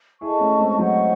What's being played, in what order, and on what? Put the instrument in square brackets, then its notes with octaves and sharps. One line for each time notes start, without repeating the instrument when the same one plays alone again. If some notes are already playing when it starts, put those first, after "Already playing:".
[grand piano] E4 G#4 [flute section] A4 D#5 A5 C#6
[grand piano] A3 C#4
G#3 C4
[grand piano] F#3 A3 [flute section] C5 D#5 F#5 C#6